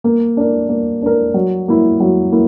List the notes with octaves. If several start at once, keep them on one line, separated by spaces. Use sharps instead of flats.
A#3
D4 A#4
A#3
D4 A#4
F#3
A#3 E4
F#3
A#3 E4